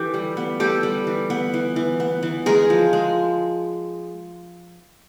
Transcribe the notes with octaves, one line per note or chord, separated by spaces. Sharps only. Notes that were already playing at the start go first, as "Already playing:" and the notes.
Already playing: E3 G4 A4
G3
B3
G3 G4 A4
G3
E3
B3
E3
E3
B3
E3
G#3 G#4 A#4
F3
G#3